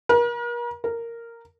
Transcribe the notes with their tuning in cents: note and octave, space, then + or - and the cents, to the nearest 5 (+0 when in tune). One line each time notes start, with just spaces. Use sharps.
A#4 +40
A#4 -10